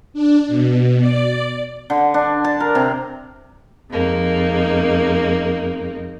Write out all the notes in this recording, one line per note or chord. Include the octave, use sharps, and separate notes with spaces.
D4
B2
D5
D3
D4
A5
A#4
C3
F2 G#3 A#3 D#4